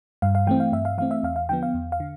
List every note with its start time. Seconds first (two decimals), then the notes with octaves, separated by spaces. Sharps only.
0.22 G2 F5
0.35 F5
0.47 E3 A3 C4 G5
0.60 F5
0.72 G2 E5
0.85 F5
0.98 E3 A3 C4 F5
1.11 E5
1.23 E2 F5
1.36 F5
1.49 D3 F3 B3 G5
1.63 F5
1.74 E2
1.92 F5
2.00 D3